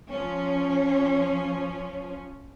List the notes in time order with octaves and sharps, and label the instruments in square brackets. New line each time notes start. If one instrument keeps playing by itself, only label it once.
[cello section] F3 C#4